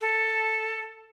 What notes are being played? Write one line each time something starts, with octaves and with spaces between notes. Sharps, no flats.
A4